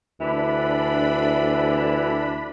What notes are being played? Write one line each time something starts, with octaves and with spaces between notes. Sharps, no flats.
D2 E3 D4 B5